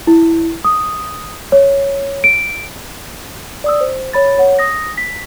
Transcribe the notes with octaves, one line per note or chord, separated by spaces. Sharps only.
E4
D#6
C#5
D7
D5 D#6 E6
C5
C#5 B5 A6
C#5 F#5
D#6 A#6
B6